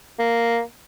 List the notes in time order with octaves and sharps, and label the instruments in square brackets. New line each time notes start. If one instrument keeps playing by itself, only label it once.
[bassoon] A#3